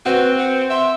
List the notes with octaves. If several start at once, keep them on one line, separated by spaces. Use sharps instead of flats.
C4 F#4 B4
F#5
E5 C6